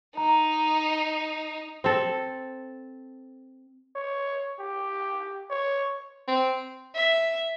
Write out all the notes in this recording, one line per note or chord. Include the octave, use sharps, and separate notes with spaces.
D#4 A#5
C4 A4
C#5
G4
C#5
C4
E5